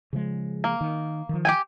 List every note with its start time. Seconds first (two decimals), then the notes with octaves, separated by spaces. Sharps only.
0.13 C#3 F3 G#3
0.64 A#3
0.81 D#3
1.29 D#3 F3
1.45 G4 G5 G#5